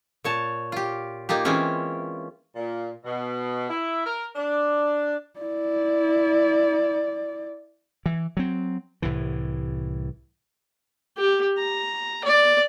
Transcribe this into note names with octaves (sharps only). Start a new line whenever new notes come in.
A#2 C#5 A5
F4 G4
A#3 D#4 F4 G4
E3 G#3 C4 C#4 F4
A#2
B2
E4
A#4
D4
E4 D5
E3
F#3 C4
C2 A2 E3
G4
A#5
D5